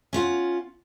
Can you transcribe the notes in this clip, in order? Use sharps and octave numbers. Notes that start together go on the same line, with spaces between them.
C#4 F4 F#5